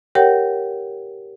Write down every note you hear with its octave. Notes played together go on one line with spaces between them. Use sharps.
G4 A#4 C#5 F#5 G5